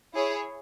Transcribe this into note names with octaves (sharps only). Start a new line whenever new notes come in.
E4 G#4 C#5